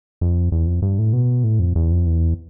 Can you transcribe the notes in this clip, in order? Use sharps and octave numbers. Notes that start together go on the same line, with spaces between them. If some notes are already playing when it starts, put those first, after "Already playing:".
F2
E2
F2
G2
A2
B2
A2
F2
E2
F2
E2